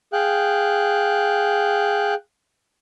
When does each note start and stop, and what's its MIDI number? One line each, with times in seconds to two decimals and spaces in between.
0.13 2.14 68
0.13 2.14 77
0.13 2.14 79
0.13 2.14 90